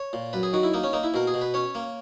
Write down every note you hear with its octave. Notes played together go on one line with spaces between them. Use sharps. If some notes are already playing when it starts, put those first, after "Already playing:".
Already playing: C#5
A#2
F#2 B4
G#4
D#3 F#4
E4
A#3 D#4
C#4
A#3 D#4
E4
B2 A#4
G#4
B2
B4
C#4 C#5
A#3